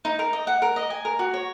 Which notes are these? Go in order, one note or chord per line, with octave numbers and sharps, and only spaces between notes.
D#4
A#4
D#5
F#5
A#4
D#5
G#5
A#4
F#4
C#5